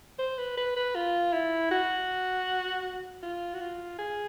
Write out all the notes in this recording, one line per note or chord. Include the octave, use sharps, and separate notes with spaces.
C5
B4
B4
B4
F4
E4
F#4
F4
F#4
F4
G#4